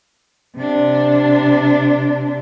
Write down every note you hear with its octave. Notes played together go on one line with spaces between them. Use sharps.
C3 D4